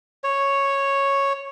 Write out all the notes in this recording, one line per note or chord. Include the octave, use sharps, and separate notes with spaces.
C#5